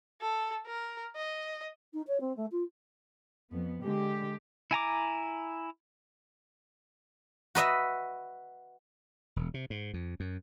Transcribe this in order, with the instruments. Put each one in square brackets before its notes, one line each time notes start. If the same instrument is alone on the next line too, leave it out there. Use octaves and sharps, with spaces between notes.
[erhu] A4
A#4
D#5
[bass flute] D#4
C#5
C4
A3
F4
[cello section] F2 B3
D3 G#3 G4
[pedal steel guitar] E4 G#5 A#5 D6
[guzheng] F#4 B4 D#5 E5
[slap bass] E1
C3
G#2
F2
F#2